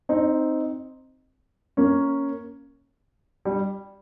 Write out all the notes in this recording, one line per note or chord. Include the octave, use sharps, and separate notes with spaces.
C4 D#4
A#3 C#4
G3